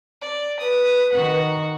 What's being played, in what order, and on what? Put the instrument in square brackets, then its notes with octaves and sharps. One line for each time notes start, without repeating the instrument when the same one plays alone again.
[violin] D5
[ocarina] B4 [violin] D#6
[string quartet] D#3 [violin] F#4 F#5